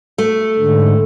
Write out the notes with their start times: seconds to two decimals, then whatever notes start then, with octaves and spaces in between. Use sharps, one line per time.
0.18 A3
0.58 G#2 D3